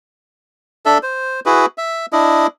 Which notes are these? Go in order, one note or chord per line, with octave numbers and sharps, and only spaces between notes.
D4 A4 E5
C5
E4 F#4 G#4 B4
E5
D4 E4 D#5